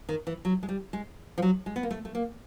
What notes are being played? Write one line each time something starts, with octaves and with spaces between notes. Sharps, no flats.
D#3
E3
F#3
G#3
G3
G#3
F3
F#3
G#3
B3
A#3
A3
A3
A#3